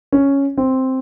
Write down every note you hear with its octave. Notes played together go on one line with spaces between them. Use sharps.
C#4
C4